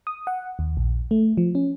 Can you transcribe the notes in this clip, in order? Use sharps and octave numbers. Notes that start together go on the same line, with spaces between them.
D#6
F#5
D#2
A#1
A3
F3
C#4